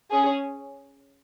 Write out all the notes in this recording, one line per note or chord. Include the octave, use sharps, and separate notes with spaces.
C#4 G#4